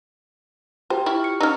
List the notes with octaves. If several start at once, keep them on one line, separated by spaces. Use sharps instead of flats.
F4 G4 C5 G5
E4 C#6 F6
C#7
C#4 D#4 B4 E6 F6